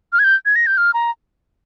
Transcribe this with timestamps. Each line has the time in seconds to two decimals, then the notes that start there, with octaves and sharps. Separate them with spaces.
0.13 F6
0.19 G#6
0.24 G6
0.46 G#6
0.56 A#6
0.67 G6
0.78 F6
0.94 A#5